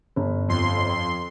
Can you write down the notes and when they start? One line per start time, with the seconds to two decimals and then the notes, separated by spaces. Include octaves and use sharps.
0.16 G1
0.49 F2 C6